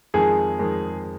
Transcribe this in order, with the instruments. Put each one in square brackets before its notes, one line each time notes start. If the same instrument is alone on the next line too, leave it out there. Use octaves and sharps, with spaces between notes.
[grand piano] F2 D#3 G#3 [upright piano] G#4
[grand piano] F2 D#3 G#3